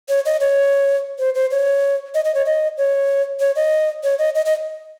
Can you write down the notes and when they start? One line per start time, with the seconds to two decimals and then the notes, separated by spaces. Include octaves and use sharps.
0.09 C#5
0.26 D#5
0.41 C#5
1.19 C5
1.35 C5
1.51 C#5
2.15 D#5
2.25 D#5
2.35 C#5
2.46 D#5
2.78 C#5
3.40 C#5
3.56 D#5
4.04 C#5
4.19 D#5
4.35 D#5
4.46 D#5